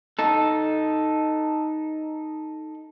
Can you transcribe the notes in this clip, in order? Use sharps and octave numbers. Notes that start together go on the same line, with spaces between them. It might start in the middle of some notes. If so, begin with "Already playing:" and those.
D#4 A4